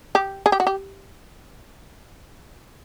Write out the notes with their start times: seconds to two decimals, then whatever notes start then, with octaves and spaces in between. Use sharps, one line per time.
0.15 G4
0.46 G#4
0.52 G4
0.60 F#4
0.67 G4